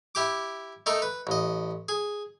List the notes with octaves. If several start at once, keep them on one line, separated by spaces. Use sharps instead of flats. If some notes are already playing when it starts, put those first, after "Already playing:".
E4 G4 D6
A3 D#4 A4 A#4
B4
A1 D#5
G#4